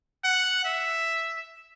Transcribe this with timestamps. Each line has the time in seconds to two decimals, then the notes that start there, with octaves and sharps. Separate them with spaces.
0.24 F#5
0.65 E5